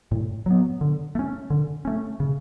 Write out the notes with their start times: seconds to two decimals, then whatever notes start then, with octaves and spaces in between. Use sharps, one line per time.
0.11 A2
0.46 F#3 B3
0.81 D3
1.15 A3
1.19 C#4
1.50 D3
1.85 A3 C#4
2.20 C#3